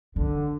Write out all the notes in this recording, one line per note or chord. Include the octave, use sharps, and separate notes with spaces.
D3 D#3